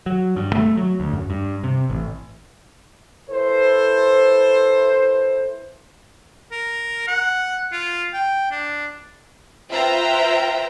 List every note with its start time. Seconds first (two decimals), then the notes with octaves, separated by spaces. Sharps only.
0.06 F#3
0.36 G2
0.53 A3
0.77 F#3
1.00 D2
1.13 F#2
1.30 G2
1.64 C3
1.90 A1
3.29 E4 A4 B4 C5
6.52 A#4
7.08 F#5
7.72 F4
8.14 G5
8.51 D4
9.71 F4 B4 C5 E5 G5 A#5